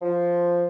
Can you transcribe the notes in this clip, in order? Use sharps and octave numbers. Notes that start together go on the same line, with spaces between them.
F3